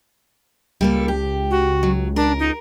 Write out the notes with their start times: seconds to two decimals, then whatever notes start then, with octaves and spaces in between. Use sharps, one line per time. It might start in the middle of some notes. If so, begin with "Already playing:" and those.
0.81 C#2 G3 A#3 A4
1.08 G4
1.51 F#4
1.83 F#3
2.16 D4 A#4
2.39 D#4